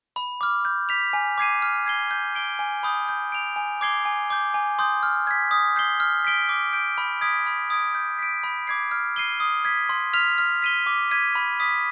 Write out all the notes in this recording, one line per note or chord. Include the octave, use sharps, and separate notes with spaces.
B5
D6 F6
G6
B6 F7
G#5
D6 G#6 C7 D#7
F6
G#6 C7 G7
G6
D7 G7
G#5
B5 D#6 G6
G6
D7 F7
G#5
D6 G#6 C7 G7
G#5
D6 G6
G#5
C6 D#6 G6
F6
G#6 B6
D#6
G6 C7 G7
F6
B6 D7 G7
D6
G6 D7
B5
D#6 G#6 B6 D7
B5
D#6 G#6 D7
G6
B6 D7
B5
D6 G#6 C7
F6
C7 D#7 G7
D#6
G#6 B6
C6
F6 B6 F7
F6
B6 D#7 G7
D6
G#6 B6 D#7
B5
D#6 B6